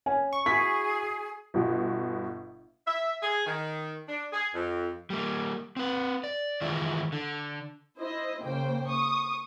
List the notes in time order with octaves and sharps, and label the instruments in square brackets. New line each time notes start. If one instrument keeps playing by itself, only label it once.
[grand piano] C#4 [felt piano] G#5
[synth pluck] C#6
[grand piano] E4 F#4 [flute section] G#4 [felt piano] B6
[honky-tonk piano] G1 B2
[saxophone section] E5
G#4
D#3
D4
G#4
F2
[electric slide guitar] G3 A#3
C4 B4
D5
D#3 E3 G#3 E4 F4
D3
[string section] E4 C5 D#5
C#3 A#3 C5 G5
C#6 D#6